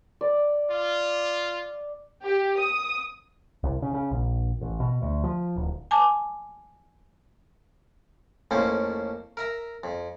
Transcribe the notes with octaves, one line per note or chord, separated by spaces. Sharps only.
D5
F4
G4
D#6
C2
C#3
C#3
A#1
A1
B2
D2
F3
D1
G#5 A5 D6
F2 A2 A#3 C#4 C5
A#4 E5 A#5
F2